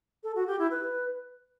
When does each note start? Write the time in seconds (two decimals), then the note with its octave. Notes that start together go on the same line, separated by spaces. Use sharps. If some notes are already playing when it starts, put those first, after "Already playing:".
0.24 A4
0.35 F#4
0.47 G4
0.59 E4
0.71 B4